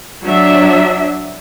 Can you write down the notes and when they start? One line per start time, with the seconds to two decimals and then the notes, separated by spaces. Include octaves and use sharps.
0.22 F#3 D4 E5